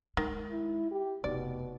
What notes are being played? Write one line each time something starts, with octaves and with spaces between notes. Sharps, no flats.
D#3 G#3
E4
G4
F1 B2 D#4 D5